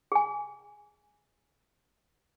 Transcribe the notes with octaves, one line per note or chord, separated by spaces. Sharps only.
G#4 G#5